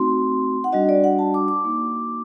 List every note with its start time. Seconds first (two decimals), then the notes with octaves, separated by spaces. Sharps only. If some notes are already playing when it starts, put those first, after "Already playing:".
Already playing: A3 C4 D#4 F#4 C6
0.64 F#5
0.72 G3 D4 F#4 D#5
0.89 D5
1.04 F#5
1.19 A5
1.34 D6
1.48 D6
1.64 A#3 D#4 F#4